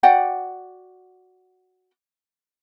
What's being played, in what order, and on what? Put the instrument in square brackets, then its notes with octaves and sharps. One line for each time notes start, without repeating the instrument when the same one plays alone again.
[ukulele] F#4 D5 F#5 G5